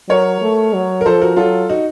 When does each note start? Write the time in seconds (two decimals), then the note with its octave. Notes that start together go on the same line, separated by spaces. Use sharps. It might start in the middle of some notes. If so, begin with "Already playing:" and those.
0.09 F#3 A#4 C#5
0.42 A3
0.74 F#3
1.01 A#4
1.05 F3 A4 C5
1.21 F#4 A#4
1.37 F#3 F4 A4
1.69 D#4 F#4